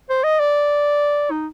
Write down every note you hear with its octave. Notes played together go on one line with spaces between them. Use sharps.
C5
D#5
D5
D#4